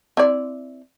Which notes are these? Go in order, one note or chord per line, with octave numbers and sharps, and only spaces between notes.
C4 E4 D5